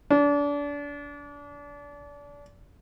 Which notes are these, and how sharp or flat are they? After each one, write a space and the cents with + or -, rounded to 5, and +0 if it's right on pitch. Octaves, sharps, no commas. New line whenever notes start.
D4 -30